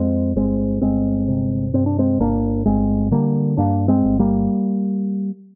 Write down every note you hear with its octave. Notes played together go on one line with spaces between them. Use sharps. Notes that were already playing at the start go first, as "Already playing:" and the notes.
Already playing: F2 G#3 C4
G1 G#3 C4
G1 G#3 C4
C3
G2 C4
D4
G#3 C4
G1 A#3 D4
G1 G#3 C4
D3 G3 A#3
G2 A#3 D4
G#3 C4
G1
G3 A#3